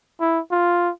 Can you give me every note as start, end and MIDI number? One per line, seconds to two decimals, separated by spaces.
0.20 0.40 64
0.51 0.90 65